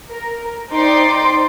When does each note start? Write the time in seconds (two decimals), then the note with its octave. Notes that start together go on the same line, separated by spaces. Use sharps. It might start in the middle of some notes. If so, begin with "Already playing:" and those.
0.10 A#4
0.71 D#4 C5 D5 G5 C6 D6